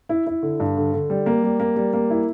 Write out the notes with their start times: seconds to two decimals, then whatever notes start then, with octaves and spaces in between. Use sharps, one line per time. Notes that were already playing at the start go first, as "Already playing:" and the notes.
0.09 E4
0.27 E4
0.42 D3
0.60 G2
0.77 D3
0.93 D3
1.10 G3
1.26 A#3
1.43 G3
1.60 A#3
1.76 G3
1.93 A#3
2.10 E4